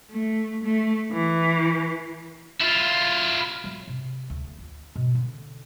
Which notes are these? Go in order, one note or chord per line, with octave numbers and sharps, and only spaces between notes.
A3
A3
E3
E4 F4
F#3
C3
D2
F4
B2
D3